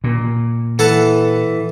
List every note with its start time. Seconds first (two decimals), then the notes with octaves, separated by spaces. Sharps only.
0.04 A#2
0.79 E3 A4 F#5 A5